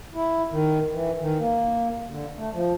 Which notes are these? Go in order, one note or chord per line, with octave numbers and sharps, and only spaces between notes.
E4
D#3
E3
D#3
A#3
D3
A3
F3